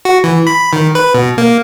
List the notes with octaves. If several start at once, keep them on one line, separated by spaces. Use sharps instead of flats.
F#4
E3
B5
D#3
B4
B2
A#3